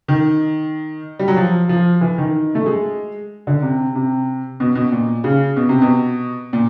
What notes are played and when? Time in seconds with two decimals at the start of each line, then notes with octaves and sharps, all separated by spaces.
0.08 D#3
1.19 G3
1.28 F#3
1.37 F3
1.69 F3
2.01 E3
2.18 D#3
2.55 A3
2.66 G#3
3.47 D3
3.62 C3
3.95 C3
4.60 B2
4.75 B2
4.92 A#2
5.24 C#3
5.57 B2
5.69 C3
5.82 B2
6.53 A#2